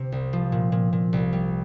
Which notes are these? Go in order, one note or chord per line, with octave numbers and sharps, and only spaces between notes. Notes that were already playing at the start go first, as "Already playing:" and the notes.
Already playing: C3
C2
F3
A#2
A#2
A#2
C2
G3